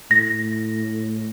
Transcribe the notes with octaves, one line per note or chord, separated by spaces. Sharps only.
A2 A#6